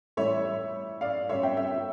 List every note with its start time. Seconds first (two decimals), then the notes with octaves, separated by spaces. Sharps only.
0.17 A2 E3 G3 C#5 E5
1.01 D5 F5
1.29 C#3 G3 C#5 E5
1.43 E5 G5
1.57 E5 G5